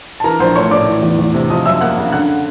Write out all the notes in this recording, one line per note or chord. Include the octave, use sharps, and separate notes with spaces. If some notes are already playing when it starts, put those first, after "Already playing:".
A5
E3 A#4 A#5
A#1 C5 C6
A3 C#5 C#6
A2 D5 D6
E3
E2
E2
C3
F3 D#5 D#6
F#2 E5 E6
A#3 F#5 F#6
C#3
D3 F#5 F#6